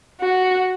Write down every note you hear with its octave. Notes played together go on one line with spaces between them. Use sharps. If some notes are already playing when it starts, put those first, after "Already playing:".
F#4